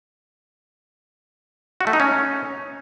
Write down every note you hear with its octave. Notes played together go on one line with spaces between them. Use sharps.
F#4
A3
D#4
C#4